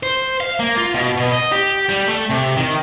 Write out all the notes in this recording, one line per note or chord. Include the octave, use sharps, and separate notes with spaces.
C5
F5
A#3
F4
B2
B2
D#5
G4
G3
A3
C3
D#3